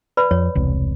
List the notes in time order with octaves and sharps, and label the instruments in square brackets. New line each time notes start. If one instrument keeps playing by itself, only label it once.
[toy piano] B4 D5 B5
[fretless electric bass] F2 [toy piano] C#5
[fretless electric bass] E1 C2